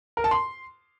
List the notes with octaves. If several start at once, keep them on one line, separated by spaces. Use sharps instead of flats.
A#4
A5
C6